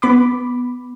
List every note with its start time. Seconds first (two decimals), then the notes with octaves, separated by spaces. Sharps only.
0.02 B3 B5 D6